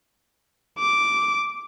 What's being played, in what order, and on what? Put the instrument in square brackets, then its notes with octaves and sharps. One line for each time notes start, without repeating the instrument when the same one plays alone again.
[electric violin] D6